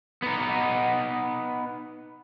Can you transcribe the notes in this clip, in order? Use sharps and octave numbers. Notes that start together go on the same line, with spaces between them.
B3 D#4